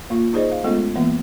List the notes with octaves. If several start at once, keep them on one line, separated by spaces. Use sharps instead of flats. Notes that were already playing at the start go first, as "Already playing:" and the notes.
A#3 F4
D#4 G4 G#4 C5 D5 D#5
F5
G#3 A3 B3 C#4 F4 A4
E3 A#3 B3 E5